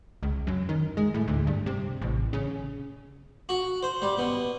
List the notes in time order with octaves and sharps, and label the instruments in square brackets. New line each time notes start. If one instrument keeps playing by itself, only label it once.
[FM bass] C#2
F#2
D#3
G#3
A2
D2
G2
C3
A1
C#3
[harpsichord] F#4
C5
G3
B2